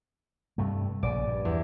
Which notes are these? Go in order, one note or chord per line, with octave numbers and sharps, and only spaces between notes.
G2 C3 A3
A#1 C#3 D5
G2
E2